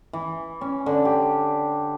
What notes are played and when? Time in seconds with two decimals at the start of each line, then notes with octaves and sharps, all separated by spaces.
0.13 E3
0.61 C#4
0.86 D3
1.05 G4